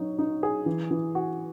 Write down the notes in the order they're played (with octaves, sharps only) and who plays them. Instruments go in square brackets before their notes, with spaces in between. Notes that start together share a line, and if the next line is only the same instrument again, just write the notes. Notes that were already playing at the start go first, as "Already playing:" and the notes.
Already playing: [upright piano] F#3 D#4
D#4
G#4
E3
E3
F#4